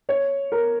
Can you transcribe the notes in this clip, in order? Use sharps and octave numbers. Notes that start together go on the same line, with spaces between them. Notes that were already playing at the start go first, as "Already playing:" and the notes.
C#5
A#4